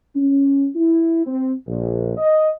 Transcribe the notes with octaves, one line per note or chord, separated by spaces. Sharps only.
C#4
E4
C4
A#1
D#5